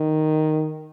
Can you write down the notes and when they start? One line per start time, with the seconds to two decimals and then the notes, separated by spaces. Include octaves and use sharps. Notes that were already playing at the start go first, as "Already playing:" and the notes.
Already playing: D#3